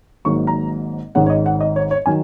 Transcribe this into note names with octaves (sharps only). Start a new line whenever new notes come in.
G#1 G#2 F#3 A#3 C#6
A#5
G#1 G#2 G#3 C#4 F#5
C#5
D#5
F#5
D#5
C#5
C#5
D#3 F#3 G#5